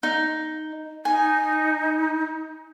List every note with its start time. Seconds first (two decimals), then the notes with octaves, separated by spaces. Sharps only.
0.03 D#4
1.05 D#4 G#5